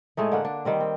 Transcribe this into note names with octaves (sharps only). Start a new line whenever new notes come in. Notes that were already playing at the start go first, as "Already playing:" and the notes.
A2 G#3 A3 D#4
D3 A#3 D4 F#5
D4
D#3 G3 C4
C4